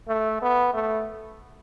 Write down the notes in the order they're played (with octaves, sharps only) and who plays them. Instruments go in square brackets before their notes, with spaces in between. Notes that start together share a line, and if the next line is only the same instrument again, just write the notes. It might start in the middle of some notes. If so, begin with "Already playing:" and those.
[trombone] A3
B3
A3